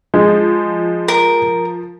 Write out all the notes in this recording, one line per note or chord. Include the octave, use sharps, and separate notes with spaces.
F3 G#3
A#4